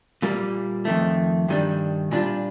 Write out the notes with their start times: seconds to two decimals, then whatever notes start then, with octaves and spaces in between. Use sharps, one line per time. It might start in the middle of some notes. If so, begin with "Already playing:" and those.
0.22 A#2 G3 A#3
0.85 F2 D#3 A3
1.48 G2 D#3 G3 D4
2.11 A#2 G3 D4 F4